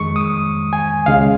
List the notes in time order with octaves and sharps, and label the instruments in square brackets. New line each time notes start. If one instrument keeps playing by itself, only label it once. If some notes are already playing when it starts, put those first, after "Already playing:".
Already playing: [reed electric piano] F2 D#3 G#3 C#6
D#6
G#5
C#2 C#3 G#3 F5